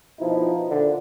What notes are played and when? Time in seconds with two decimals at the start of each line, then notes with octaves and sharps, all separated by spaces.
0.20 B2 F3 D#4 E4
0.70 A#2 D3